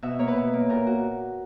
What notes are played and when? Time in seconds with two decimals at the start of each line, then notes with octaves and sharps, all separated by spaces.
0.03 B2 E5
0.19 A#3 C#5
0.28 B4
0.36 B2
0.54 A#3
0.69 A#2 A#4
0.87 F#4